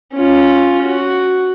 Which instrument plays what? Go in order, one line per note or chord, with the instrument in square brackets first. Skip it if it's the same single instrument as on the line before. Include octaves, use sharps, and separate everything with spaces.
[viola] C#4 F4
F#4